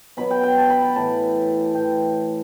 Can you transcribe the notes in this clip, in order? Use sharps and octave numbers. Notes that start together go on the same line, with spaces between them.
B2 F#3 B5
G5
G5
A5
B5
B5
A2 E3 A5
A2 E3 G5